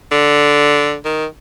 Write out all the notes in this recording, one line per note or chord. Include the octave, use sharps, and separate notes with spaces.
D3
D#3